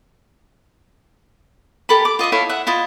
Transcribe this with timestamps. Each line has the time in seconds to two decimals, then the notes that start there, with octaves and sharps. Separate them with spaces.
1.89 G4 A4 A#4 B5
2.05 D6
2.19 F4 D#5 E5 D#6
2.32 E4 A4 C#5 F5
2.49 E5 F#5
2.67 E4 F4 D#5